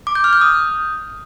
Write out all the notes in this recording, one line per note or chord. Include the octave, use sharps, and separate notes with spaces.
D6
G6
F6
G6
D#6